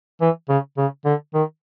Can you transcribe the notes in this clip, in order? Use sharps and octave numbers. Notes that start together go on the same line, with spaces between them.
E3
C#3
C#3
D3
D#3